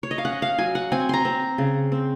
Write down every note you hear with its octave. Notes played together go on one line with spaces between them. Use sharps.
C#5
D#5
F5
C#4 F#5
F5
F#3 G#5
F#5
C4 G#5
A#5 C6
C4
C#3
C4